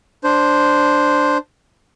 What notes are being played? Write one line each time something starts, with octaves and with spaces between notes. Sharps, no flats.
D4 C5